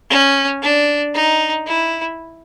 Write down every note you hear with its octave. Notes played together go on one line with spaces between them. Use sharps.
C#4
D4
D#4
E4